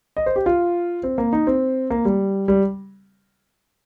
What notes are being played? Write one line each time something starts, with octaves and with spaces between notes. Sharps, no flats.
D#5
C5
G4
F4
C4
A#3
D#4
C4
A#3
G3
G3